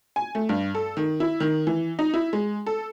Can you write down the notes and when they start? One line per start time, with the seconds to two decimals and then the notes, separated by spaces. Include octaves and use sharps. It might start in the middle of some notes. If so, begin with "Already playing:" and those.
0.16 G#5
0.35 A3
0.49 G2
0.75 A4
0.97 D#3
1.20 E4
1.40 D#3
1.67 E3
1.99 D#4
2.14 E4
2.33 G#3
2.66 A4